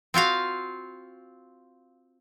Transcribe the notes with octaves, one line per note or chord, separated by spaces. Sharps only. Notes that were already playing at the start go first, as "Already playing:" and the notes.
C4 F4 F#4 F5